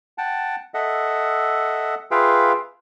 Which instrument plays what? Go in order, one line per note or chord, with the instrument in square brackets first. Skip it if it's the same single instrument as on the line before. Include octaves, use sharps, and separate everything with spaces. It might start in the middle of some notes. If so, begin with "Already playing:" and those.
[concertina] F#5 G5 A5
A4 D#5 E5 F#5
F4 G#4 B4 E5 F5 G5